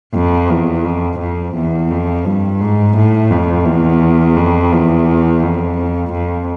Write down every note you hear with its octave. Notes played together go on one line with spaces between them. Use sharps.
F2
E2
F2
F2
E2
F2
G2
G#2
A2
F2
E2
F2
E2
F2
F2